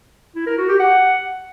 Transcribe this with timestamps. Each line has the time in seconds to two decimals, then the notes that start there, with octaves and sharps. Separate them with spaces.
0.36 E4
0.47 A#4
0.58 F#4
0.69 G4
0.80 F#5